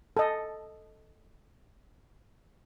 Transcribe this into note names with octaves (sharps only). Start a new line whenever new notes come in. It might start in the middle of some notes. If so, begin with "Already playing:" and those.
A4 D#5